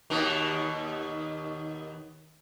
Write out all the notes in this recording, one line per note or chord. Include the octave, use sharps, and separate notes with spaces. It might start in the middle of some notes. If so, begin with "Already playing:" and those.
D#2 B2 D#3